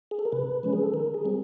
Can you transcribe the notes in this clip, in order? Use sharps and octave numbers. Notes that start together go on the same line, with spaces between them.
G#4
A4
A#4
C3 B4
F3 G#3 C#4
G#4
A4
D#3 A#4
G#4
G3 C4